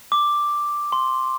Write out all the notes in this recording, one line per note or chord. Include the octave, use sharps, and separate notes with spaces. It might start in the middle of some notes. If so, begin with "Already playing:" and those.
D6
C6